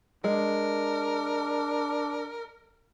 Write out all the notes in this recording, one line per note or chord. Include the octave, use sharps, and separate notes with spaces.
G#3 D4 A#4